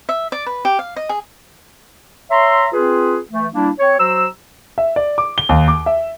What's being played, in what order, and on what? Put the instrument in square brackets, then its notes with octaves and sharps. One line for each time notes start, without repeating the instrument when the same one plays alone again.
[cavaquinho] E5
D5
B4
G4
F5
D#5
G#4
[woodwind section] C#5 E5 A#5 C6
C4 F4 G#4 B4
E3 A3
G3 A#3 D4 E4
C4 C#5
F#3 F#4 C5 A#5 E6
[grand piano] E5
D5
D6
G7
D#2
D6
E5